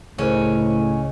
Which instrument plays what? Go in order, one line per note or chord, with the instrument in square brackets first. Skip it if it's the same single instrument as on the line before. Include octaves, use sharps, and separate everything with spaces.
[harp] C#2 [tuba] A2 [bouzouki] C#4 [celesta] G#4 A#4 C5